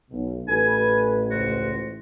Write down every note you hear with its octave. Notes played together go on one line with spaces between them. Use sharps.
B1 B2
A1 G4 A4 B4 G#5
C#2 F#4 C5